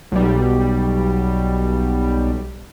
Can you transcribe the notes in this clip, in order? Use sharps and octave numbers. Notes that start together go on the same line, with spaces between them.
B1 G3